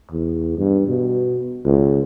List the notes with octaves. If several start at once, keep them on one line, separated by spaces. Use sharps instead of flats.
E2
G2
B2
C#2